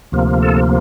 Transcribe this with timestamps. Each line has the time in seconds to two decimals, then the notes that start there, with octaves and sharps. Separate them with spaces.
0.12 D2 C3 F3 A#3
0.42 A4